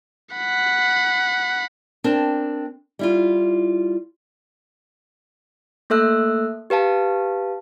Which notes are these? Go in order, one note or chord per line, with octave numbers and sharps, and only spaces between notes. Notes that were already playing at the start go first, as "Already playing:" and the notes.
F#5 B5
C4 D4 A#4 G5 A5
G3 E4 F4
A3 A#3 A4 E5 E6 F#6
G4 B4 F5 A5